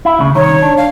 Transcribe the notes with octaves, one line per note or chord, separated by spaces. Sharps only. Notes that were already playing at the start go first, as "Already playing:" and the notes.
E4
D2 C#3
C2 D#3 C#5
D4
F5